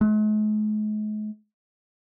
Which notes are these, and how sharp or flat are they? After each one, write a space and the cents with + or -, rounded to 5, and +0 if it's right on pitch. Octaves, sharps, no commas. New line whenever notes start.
G#3 +45